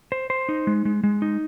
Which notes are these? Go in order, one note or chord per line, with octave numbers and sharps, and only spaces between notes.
C5
C5
D#4
G#3
G#3
G#3
D#4